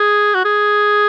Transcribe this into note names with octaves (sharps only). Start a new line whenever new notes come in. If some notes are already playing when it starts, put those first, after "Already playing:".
Already playing: G#4
F#4
G#4